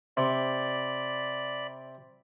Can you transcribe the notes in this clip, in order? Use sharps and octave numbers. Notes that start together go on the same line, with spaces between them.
C3 D5 B5